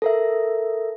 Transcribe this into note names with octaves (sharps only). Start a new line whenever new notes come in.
A4 A#4 E5